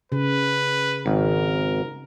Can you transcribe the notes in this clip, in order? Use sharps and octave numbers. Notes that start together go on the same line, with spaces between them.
C#3 B4
G#1 A#4